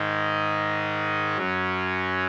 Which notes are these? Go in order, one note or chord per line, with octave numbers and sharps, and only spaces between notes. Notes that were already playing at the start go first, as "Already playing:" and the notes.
Already playing: G#2 D#3 G#3 D#4
F#2 F#3 C#4